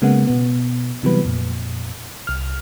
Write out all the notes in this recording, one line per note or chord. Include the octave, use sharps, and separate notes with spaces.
C#3 G#3 A#3 B3 F#5
B2 B3
C3 E3 F#3 G3 B3 B4
F2 A#2
C2 F6